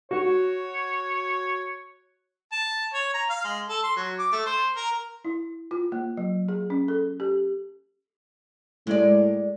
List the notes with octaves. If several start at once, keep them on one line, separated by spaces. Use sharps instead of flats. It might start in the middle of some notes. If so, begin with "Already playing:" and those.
F#4 C#5
A5
C#5
A#5
F5
G#3
A4
C6
F#3
D6
A3
C5
A#4
E4
F4
A#3
F#3
G#4
C#4
A4
G4
A2 G#3 D5